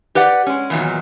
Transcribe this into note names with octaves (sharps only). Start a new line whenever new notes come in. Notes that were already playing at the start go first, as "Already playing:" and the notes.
G4 B4 D5 F#5
G#3 C#4
E2 A#2 D#3 F#3